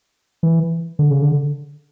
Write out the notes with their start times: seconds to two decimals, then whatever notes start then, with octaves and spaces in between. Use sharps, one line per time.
0.43 E3
0.99 D3
1.10 C#3
1.22 D3